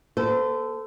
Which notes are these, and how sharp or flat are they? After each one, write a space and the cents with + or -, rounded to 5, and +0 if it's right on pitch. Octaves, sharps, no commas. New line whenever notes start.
A#3 +40 A4 +0 C5 -30